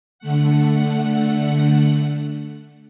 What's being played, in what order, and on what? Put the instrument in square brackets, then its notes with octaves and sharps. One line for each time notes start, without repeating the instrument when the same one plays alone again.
[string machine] D3 A3 F#5